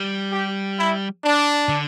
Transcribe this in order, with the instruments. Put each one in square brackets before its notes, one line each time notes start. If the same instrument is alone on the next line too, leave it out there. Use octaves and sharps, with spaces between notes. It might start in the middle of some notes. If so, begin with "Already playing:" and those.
Already playing: [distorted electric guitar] G3
[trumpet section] G4
E4
D4
[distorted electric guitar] D3